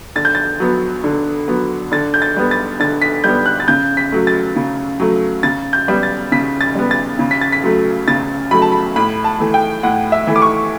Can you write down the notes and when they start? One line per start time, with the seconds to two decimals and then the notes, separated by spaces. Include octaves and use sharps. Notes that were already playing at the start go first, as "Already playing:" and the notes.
0.16 D3 A6
0.25 G6
0.35 A6
0.60 F#3 B3
1.04 D3
1.48 F#3 B3
1.92 D3 A6
2.14 G6
2.22 A6
2.37 G3 B3
2.51 A6
2.80 D3 A6
3.02 B6
3.24 G3 B3 G6
3.46 F#6
3.60 A6
3.68 C#3 G6
3.97 B6
4.12 F#3 A3
4.27 A6
4.56 C#3
5.00 F#3 A3
5.43 C#3 A6
5.73 G6
5.88 G3 B3
6.03 A6
6.32 C#3 B6
6.61 A6
6.75 G3 B3
6.91 A6
7.19 C#3
7.31 B6
7.41 A6
7.52 B6
7.64 F#3 A3
8.08 C#3 A6
8.51 F#3 A3 B5
8.62 A5
8.72 B5
8.96 A2 B5
9.24 A5
9.40 E3 A3
9.54 G5
9.83 A2 F#5
10.12 E5
10.27 E3 A3
10.36 D6
10.42 C#6